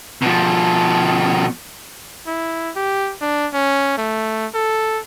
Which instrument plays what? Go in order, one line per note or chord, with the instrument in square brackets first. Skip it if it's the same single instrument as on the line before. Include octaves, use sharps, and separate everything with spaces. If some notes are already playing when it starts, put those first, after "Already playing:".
[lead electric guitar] B2 F3
[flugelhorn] E4
G4
D4
C#4
A3
A4